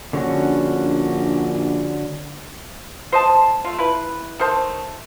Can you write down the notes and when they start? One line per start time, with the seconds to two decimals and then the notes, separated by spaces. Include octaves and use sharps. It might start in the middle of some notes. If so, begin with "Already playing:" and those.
0.13 A#1 D3 C#4 F#4
3.12 C5 D#5 A5
3.65 A3 F4
3.79 E4 B4
4.40 D#3 A3 C5 A5